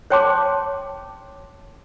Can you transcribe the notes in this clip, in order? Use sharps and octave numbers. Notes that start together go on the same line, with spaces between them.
C5 C#5 G5 A5 C6 D6